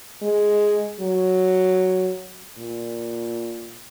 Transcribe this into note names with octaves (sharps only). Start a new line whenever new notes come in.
G#3
F#3
A#2